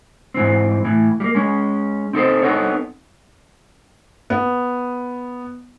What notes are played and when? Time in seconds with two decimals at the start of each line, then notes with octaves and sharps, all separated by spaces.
0.34 G#2 E3 C4
0.84 A2 E3
1.20 G3 A#3
1.35 G#3 C#4
2.13 C4 D#4 A4 C5
2.42 B3 C4 D#4 A4 C#5
4.30 B3